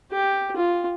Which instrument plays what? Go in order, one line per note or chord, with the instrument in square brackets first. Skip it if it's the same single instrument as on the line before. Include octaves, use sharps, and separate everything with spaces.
[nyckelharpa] G4
F4